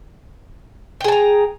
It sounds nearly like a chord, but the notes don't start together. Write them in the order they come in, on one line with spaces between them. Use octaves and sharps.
G5 G#4 A5 A#5